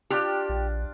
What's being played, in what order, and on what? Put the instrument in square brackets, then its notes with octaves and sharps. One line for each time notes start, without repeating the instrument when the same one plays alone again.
[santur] D4 F4 D5 [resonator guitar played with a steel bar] G4
[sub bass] A#1